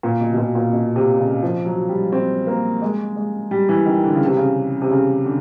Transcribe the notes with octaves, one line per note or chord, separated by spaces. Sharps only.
A#2
B2
B2
A#2
A#2
B2
C3
C#3
F3
F#3
G3
C4
A#3
G#3
G#3
G3
E3
D#3
D3
C#3
C3
C#3
C3
C#3
D3